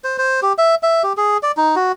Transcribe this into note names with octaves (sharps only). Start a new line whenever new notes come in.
C5
C5
G4
E5
E5
G4
G#4
D5
D#4
F#4